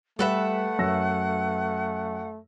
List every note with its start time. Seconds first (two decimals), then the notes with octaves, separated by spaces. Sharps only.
0.19 G3 A3 A4 B4 E5 F#5
0.79 F#2 E6 A#6